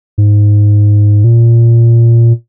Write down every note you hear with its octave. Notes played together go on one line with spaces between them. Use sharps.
G#2
A#2